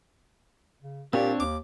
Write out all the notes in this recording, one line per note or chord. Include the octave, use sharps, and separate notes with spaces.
C#3
A#2 C4 D4 G4 C#5
D#2 D6